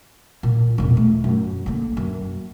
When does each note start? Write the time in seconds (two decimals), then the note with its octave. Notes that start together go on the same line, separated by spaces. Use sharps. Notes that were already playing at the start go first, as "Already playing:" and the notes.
0.43 A#2
0.78 E1 A#2
0.97 A3
1.24 F#2
1.66 D3 A#3
1.97 F#2